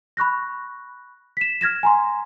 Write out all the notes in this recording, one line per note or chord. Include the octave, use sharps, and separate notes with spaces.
B5 C#6 F#6 A#6
B6 E7
F6 G#6 A#6 E7
G#5 A#5 C6